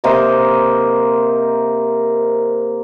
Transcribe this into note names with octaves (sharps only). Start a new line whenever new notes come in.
C3 A#3 C5 D#5